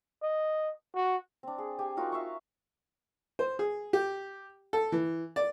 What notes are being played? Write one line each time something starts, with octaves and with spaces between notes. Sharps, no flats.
D#5
F#4
C4 D4
G#4
G4 G#5
D#4 F4 F#4 A#4
E5 F5 C#6
C5
G#4
G4
A4
E3
D5